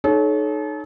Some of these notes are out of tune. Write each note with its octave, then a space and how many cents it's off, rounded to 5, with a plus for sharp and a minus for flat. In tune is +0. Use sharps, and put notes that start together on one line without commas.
D#4 -20 A4 -40 C#5 +0